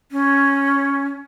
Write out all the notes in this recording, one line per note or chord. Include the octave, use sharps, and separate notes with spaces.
C#4